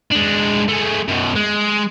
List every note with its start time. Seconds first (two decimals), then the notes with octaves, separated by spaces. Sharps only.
0.12 G#3 D4
0.69 G#3 A3
1.08 F#2 B2
1.36 G#3